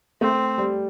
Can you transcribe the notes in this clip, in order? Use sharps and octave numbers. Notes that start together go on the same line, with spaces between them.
A3 C4
G3